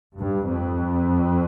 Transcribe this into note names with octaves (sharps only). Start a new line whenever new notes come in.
G2
F2